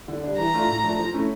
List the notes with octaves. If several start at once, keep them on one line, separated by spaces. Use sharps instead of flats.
D3
G3 D4
E3 A#5
A3 D4 F4
A2
F3 A3 D4 A4
F3
A3 C#4 E4